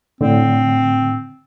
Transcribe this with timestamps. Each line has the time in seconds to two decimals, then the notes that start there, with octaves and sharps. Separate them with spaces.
0.21 A2 D3 C4